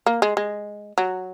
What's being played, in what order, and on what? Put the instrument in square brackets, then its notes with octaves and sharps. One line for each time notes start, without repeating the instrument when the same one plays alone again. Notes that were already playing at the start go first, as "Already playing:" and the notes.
[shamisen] A#3
G#3
G#3
F#3